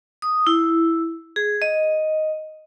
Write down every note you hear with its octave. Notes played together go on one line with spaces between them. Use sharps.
D#6
E4
G#4
D#5